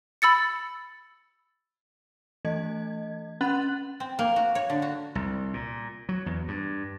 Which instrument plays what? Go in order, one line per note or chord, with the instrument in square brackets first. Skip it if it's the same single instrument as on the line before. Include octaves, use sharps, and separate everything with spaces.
[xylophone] B5 E6 A6 C#7
[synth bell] E3 A3 D#5 G#6
C#4 F#5 B5 F#6 A6 F#7
[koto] C4
A#3
F#4
C#5
D3
F#4
[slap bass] C2
A#2
F#3
E2
G2